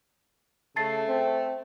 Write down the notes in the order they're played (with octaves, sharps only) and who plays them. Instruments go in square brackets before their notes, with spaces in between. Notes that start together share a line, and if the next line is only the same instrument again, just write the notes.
[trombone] C#3 [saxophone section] A3 [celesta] A5 A6 C7
[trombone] C4